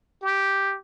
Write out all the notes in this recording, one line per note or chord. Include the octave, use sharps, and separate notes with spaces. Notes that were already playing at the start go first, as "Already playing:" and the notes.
G4